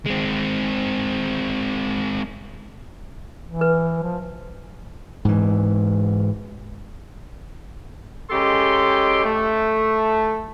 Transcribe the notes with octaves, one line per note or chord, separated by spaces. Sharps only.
G#3 C4
E3
B4
F3
G#2 E3
C#3 G#3 G4 A4 G5 C6
A3